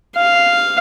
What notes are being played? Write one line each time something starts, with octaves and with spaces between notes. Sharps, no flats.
F5